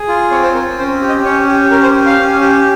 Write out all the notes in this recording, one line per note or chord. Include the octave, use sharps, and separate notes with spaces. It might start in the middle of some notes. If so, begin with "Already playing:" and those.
Already playing: G#4
F4
C4 C#5
C5
C4 A#4
C#4 C5
G4
D#5
C#4 C#5
G4
C#4 A#4
C5
G4
F5
C#4
G4